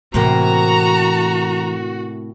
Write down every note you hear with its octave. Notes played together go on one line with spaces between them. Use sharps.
A2 C3 E3 A#3 F#4 A#5